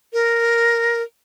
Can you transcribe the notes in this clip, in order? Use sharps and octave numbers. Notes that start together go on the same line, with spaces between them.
A#4